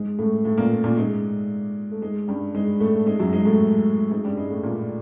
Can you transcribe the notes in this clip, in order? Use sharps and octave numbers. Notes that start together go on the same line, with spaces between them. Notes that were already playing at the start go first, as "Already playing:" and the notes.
Already playing: G#2 G#3
A2 A3
A2 A3
A#2 A#3
A#2 A#3
G#2 G#3
A3
G#2 G#3
G2 G3
G#2 G#3
A2 A3
G#2 G#3
F#2 F#3
G#2 G#3
A2 A3
G#2 G#3
G2 G3
G#2 G#3
A2 A3
A#2 A#3